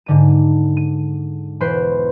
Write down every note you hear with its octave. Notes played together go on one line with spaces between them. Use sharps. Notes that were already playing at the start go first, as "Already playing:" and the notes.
G#2 D3 D#7
D#7
E1 B4 C5 C7 D7